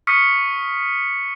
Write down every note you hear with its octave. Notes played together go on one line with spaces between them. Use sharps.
C#6 D#6 F6 B6 C#7